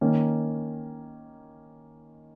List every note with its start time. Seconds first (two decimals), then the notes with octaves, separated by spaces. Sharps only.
0.01 D#3 A#3 C#4